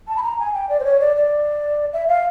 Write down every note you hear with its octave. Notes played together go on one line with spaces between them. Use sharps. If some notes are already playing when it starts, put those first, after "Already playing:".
A5
B5
A#5
G#5
G5
D5
C5
C#5
D5
D5
E5
F5